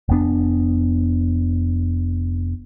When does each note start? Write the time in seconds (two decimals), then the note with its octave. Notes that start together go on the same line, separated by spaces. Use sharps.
0.09 F1 F2 B3 D4